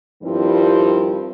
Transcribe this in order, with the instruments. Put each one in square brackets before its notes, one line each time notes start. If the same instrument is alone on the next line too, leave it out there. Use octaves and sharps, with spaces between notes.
[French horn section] G2 D#3 F3 G3 C4 E4